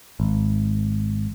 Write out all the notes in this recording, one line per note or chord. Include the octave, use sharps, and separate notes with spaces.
G#1